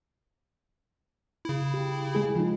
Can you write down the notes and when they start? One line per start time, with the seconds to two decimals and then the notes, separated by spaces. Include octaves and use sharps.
1.45 C#3 E4
1.74 G4
2.15 G#3 G#4
2.35 F3 D#4